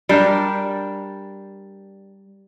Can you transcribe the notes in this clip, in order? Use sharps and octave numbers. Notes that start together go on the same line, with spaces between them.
G3 D4 G4 A#4